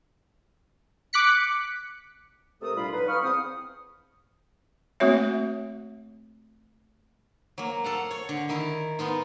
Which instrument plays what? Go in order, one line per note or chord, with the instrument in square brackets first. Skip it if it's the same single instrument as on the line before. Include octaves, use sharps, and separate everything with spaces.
[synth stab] D6 F#6 B6 C#7
[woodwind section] C3 A3 A4 A#4 D#6
C2 A#2 G3 D4 F4 B5
D3 F#3 D#4 B4
F5 B5 C#6 D#6 F6
E2 C4 C5 D#6
[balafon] A3 A#3 C4 F#4 C#5 E5
[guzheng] F#3 A#3
A4 F5 F#5
C#5
D3
D#3 D#4 E4 A#4
G#3 B3 D#4 F4